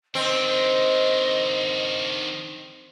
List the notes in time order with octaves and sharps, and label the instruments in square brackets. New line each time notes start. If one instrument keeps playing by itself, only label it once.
[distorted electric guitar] D#3 D4 [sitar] C4 [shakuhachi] D#5